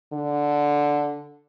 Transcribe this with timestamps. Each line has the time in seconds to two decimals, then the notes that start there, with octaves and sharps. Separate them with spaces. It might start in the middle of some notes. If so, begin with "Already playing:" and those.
0.13 D3